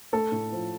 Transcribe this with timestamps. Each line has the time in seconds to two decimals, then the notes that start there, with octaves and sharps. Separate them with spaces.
0.13 A3 A4
0.32 A2
0.52 F3